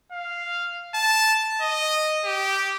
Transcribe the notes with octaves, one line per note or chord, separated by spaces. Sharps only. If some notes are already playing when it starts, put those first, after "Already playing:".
F5
A5
D#5
G4